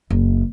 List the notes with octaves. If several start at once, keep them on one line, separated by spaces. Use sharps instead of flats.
F#1